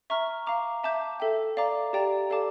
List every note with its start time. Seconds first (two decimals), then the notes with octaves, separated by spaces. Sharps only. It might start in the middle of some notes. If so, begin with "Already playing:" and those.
0.10 E5 A#5 C#6 F6
0.47 F5 A#5 D6
0.84 E5 A5 D6 G6
1.20 A4 E5 G5
1.57 D5 F5 A#5 D6
1.93 G4 D5 G5 A#5
2.30 A4 D5 F5 A5 D6